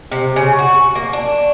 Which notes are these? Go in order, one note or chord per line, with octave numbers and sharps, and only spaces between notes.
C3
C#3
F#4
A#3
D4